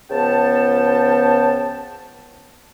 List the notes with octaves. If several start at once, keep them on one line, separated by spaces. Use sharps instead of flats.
C#2 C#3 F3 B3 G5 A5